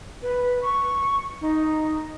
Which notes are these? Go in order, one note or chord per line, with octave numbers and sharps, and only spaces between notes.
B4
C#6
D#4